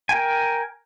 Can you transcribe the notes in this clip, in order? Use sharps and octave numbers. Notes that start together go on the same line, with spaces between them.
A#4 G5 G#5